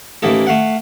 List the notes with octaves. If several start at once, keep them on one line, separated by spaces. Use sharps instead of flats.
A1 E3 A#3 D#4 A4
A3 F5 F#5